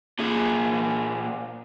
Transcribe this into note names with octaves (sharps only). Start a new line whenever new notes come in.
A#2 G#4